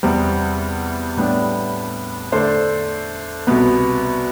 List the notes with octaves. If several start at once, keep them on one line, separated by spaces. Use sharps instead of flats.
E2 C3 G3 C4
A2 G3 B3 D4
D3 A3 D4 A4 C5
C2 B2 B3